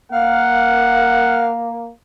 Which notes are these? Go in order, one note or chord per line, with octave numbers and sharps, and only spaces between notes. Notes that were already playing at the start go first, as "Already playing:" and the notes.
A#3 F5 F#5